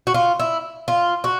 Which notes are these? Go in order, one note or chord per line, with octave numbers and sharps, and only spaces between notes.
F#4
F4
E4
F4
F#4